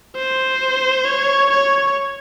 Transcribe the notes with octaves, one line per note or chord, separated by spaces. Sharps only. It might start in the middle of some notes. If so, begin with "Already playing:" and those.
C5
C#5
C#5